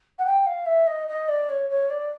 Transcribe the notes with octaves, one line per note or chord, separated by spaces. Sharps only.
F#5
G5
F5
E5
D#5
D#5
D5
C#5
C#5
D5